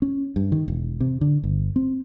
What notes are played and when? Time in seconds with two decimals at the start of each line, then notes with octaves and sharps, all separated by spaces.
0.02 C#4
0.36 G2
0.52 D#3
0.68 E1
1.00 C3
1.21 D3
1.44 G1
1.76 C4